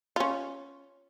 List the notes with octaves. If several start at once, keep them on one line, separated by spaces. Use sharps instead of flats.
C#4 F4